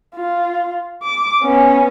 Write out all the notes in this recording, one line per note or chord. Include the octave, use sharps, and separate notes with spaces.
F4
D6
B3 C#4